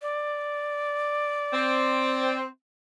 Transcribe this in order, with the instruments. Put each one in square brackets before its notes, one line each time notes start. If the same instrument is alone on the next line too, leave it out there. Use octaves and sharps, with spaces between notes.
[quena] D5
[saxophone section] C4